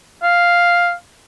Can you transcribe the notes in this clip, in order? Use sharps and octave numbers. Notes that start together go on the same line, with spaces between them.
F5